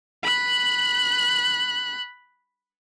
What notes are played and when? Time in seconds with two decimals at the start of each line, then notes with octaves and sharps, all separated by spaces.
0.23 B5 F#6